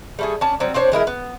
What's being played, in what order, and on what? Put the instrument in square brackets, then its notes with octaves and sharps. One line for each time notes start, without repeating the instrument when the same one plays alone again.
[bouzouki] G3 A3 G#4
C#4 D4 A5
F#3 G3 C4
C4 D4 C5 C#5
E3 G#3 E4 A#4
B3